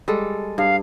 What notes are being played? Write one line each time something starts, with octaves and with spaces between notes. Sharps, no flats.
G3 G#3 A4
G2 F5